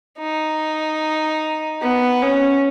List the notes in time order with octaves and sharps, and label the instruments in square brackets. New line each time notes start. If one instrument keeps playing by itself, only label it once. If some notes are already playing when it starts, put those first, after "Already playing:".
[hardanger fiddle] D#4
B3
C#4